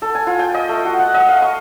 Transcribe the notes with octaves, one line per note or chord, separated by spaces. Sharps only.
A4
G#5
F4
G5
D#5
A3
F#4
F#5
D#5
F5
C#6